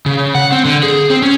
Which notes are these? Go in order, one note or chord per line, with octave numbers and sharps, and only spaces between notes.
C#3
F#5
C4
D3
G#4
C4
C#4